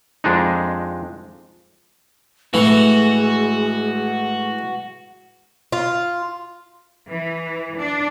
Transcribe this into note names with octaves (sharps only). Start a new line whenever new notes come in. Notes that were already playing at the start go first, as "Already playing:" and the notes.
F2 G#3 D4 D#4
A2 E3 G#3 A3 F#4 F#5
F4
E3
D4